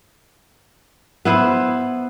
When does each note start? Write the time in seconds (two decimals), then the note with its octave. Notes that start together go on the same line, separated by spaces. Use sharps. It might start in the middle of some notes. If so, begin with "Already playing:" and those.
1.25 B3 E4 C5